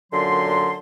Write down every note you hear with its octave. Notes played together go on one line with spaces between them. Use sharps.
F#2 A#2 D3 F#3 C6